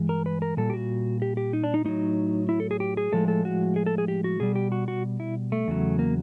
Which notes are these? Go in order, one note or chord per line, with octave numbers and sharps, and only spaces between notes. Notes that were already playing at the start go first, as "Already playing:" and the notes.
Already playing: G2 E3 G#3
A#4
B4
A#4
A#2 G3 A4
G4
F#4
G4
G4
D#4
D4
D#4
A2 F#3 D#4
E4
A4
G#4
G4
G#4
A2 F3 G#3 A4
A4
F#4
G#4
A4
G#4
G4
F#4
B2 G3 G#4
G4
F#4
F#4
E4
A3
E2 C#3 F#3
A#3